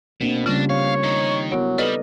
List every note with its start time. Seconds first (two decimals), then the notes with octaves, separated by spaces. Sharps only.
0.21 B2 A#3 C4 D4
0.46 C#3 G3 A3 C#4 D4 F4 A#6
0.70 C#5 F5
1.04 D#3 D#4
1.51 F#3 B3 E4 A#4
1.78 G3 A4 B4 D5 D#5 F6